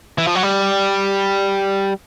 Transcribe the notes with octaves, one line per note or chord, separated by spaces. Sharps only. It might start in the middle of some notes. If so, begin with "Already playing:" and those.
E3
F3
F#3
G3